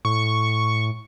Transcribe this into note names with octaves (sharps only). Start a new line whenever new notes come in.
A2 C#6